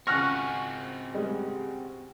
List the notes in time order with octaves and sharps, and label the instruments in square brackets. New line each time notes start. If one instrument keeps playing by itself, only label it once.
[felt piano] C#2 G#5 A#6 [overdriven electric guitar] C4 F#4 [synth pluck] C#6 F6 F#6
[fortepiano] G3 G#3